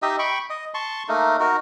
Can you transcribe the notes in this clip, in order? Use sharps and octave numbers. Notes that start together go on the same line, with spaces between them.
D#4 G4 D#5 E5
G5 B5 C#6
D#5
A5 C6 C#6
A3 A#3 D#4
D#4 F#4 A#4